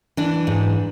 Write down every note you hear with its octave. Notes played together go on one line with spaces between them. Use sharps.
E3 D4
G#2